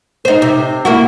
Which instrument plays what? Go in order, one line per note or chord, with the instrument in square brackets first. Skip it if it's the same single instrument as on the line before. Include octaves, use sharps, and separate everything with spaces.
[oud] D#4 C5
C3
A#3 E4 F#4